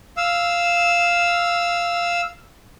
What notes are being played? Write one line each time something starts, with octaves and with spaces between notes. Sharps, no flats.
F5 E6